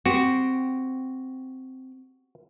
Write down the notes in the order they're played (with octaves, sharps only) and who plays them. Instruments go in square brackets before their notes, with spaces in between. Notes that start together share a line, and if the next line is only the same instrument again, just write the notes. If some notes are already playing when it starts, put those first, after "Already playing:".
[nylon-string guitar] C4 [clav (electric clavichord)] F#4 G4